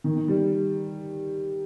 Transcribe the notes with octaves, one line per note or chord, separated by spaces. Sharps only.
D#3
D#3
G3